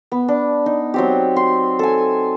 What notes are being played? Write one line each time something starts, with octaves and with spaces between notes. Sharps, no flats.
B3
D4
D#4
F#3 C4 G4
C6
A4 G#5